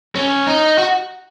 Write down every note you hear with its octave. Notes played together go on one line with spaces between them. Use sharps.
C#4
D#4
F#4